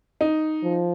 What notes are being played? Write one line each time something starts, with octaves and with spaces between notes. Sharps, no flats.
D#4
F3